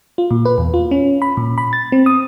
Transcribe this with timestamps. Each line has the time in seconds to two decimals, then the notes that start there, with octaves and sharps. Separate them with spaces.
0.18 F4
0.31 A#2
0.45 B4
0.58 E2
0.74 F4
0.91 C#4
1.22 B5
1.37 A#2
1.58 B5
1.73 A6
1.92 C4
2.06 D#6